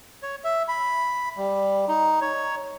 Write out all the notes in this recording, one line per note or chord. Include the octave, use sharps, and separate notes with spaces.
C#5
E5
B5
G3
D#4
C#5